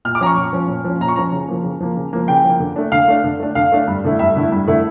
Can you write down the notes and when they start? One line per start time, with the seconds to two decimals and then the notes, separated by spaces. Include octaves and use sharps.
0.05 A#2 F6
0.15 D6
0.21 F3 C#4 A#5
0.26 C#6
0.37 A#2
0.53 F3 C#4
0.68 A#2
0.84 F3 C#4
1.01 A#2 A#5
1.08 C#6
1.16 F3 C#4 A#5
1.32 C#3
1.48 F3 A#3
1.64 C#3
1.81 F3 A#3
1.97 C#3
2.13 F3 A#3
2.28 C#3 G5
2.44 F3 A#3
2.60 D3
2.76 A3 D4
2.92 D3 F5
3.08 A3 D4
3.24 D3
3.39 A3 D4
3.55 D3 F5
3.72 A3 D4
3.88 G2
4.04 D3 A3 E4
4.19 G2 E5
4.36 D3 A3 E4
4.52 G2
4.68 D3 A3 E4